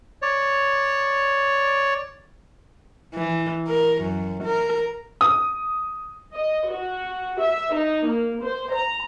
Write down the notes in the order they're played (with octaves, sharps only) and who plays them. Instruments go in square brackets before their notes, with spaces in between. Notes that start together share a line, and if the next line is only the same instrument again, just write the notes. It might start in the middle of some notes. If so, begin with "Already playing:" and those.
[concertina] C#5 D5
[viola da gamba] E3
A#4
F#2
A#4
[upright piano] D#6
[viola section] D#5
F#4
E5
D#4
A#3
C5
A#5